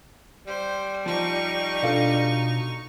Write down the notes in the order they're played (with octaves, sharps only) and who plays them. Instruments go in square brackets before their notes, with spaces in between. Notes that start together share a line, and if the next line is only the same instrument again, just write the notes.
[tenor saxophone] G3 [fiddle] C5
[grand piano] F3 [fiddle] D#4 C#6
[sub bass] B2 [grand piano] D4 F4 A4